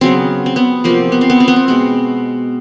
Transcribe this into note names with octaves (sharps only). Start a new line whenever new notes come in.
C#3 F#3 B3 C4
C4
B3
C3 F3 A#3 C4
B3
C4
B3
C4
B3
C4
B2 G#3 B3